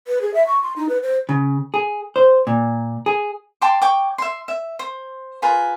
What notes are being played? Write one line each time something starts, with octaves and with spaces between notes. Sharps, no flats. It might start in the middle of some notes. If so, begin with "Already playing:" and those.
B4
G#4
E5
C#6
C6
D#4
B4
C5
C#3
G#4
C5
A#2
G#4
G5 A5 C6 D6
C#5 G5 D6
E5 C6
E5
C5
F4 G#4 A#4 B4